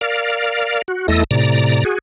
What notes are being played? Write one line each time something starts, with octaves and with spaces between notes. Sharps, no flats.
A#4 D5 F5
F#4
E2 A3 E4 A4 D#5 A#6
A2 C3 D5 A#5
F#4 G#4